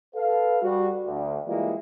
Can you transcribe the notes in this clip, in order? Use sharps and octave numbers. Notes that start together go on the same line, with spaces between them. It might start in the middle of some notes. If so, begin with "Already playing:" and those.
A4 B4 F5
G3 F#4
D2
E3 G3 G#3 A#3 E4 F4